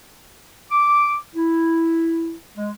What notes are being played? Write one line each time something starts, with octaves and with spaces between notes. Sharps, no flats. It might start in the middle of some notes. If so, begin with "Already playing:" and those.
D6
E4
G#3